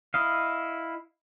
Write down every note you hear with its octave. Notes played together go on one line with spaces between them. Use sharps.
E4 D#5 F5